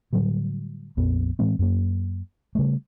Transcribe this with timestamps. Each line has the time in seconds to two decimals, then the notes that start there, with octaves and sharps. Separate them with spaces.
0.13 A2 D3 F#3 G3
0.97 A#1 F2 B3
1.39 A2 E3 G#3 C4
1.59 F#2 A#3
2.55 C#3 G3 A3